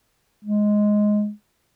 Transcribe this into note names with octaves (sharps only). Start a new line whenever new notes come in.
G#3